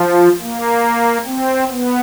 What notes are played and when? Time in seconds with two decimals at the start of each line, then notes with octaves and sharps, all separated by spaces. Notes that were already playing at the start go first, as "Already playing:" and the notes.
Already playing: F3
0.41 A#3
1.26 C4
1.70 B3